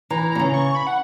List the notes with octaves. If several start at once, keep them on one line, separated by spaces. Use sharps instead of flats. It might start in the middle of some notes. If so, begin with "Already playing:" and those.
E3 A#5
B2 A#5
C#3
C#6
B5
F#5